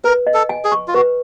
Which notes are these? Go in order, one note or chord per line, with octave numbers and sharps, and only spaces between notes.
A#4 B4
D#5
A4
G#5
G#4
C#6
F4
F#4 B4